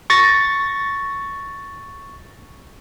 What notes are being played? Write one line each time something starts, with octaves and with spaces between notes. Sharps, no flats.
C#6 A6 A#6